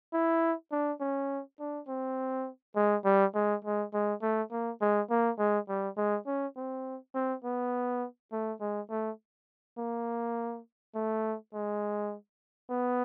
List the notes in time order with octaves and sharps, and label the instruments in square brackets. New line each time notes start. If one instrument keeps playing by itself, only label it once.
[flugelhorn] E4
D4
C#4
D4
C4
G#3
G3
G#3
G#3
G#3
A3
A#3
G#3
A#3
G#3
G3
G#3
C#4
C4
C4
B3
A3
G#3
A3
A#3
A3
G#3
B3